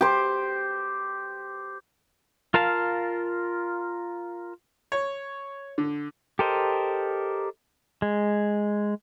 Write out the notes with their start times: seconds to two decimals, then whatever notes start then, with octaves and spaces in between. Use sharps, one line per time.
0.01 G4 C5
2.54 F4 A#4 F5 A5
4.92 C#5
5.78 D3
6.39 G4 A4 A#4 C5 D#5
8.02 G#3